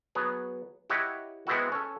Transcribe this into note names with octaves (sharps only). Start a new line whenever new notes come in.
F#3 B3 G#4
E4 G4 C#5 D#5 F#5
G#3 B3 C4 E4 F#4
C#4 A4